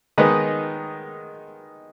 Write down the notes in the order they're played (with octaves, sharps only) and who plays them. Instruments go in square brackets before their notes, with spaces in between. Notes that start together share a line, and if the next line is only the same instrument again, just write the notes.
[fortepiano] D#3 G#3 B3 D#4 B4 D#5